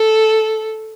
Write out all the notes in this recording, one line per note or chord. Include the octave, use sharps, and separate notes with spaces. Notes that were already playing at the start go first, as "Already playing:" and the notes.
Already playing: A4